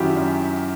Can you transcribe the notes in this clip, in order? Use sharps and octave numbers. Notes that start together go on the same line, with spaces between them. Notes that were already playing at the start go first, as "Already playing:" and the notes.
Already playing: F#2 D#3 E4 F#4 G4
F#2